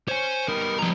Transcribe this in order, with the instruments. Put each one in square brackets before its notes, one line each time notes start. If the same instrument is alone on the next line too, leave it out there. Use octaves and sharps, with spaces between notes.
[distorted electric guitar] C5 [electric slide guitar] C#5 G#5
[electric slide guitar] G3 B3 D#4 [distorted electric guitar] A#4
[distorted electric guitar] F3 A#5